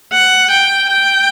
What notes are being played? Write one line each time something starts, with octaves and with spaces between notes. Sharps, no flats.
F#5
G5
G5